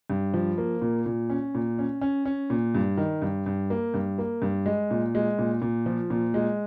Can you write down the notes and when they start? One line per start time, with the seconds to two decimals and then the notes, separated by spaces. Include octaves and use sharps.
0.10 G2
0.34 F3
0.58 A#3
0.82 A#2
1.06 A#2
1.30 C#4
1.55 A#2
1.79 C#4
2.01 C#4
2.25 C#4
2.50 A#2
2.75 G2
2.97 D#3
3.22 G2
3.46 G2
3.70 A#3
3.94 G2
4.18 A#3
4.42 G2
4.66 G#3
4.91 A#2
5.15 G#3
5.39 A#2
5.62 A#2
5.86 F3
6.10 A#2
6.34 G#3